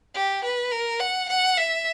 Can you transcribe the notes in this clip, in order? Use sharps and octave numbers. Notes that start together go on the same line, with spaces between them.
G4
B4
A#4
F#5
F#5
E5